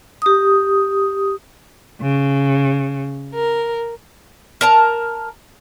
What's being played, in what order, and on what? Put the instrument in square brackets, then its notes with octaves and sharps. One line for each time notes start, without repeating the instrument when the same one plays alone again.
[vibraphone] G4 D#6
[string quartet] C#3
A#4
[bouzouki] A#4 A5 A#5